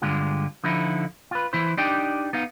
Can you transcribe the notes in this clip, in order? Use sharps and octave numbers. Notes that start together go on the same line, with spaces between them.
G2 D3 G#3 F4
D3 F3 D#4 E4
F4 B4
E3 E4 C5
D4 D#4 G4 D5 D#5 G5
B3 D#4 F5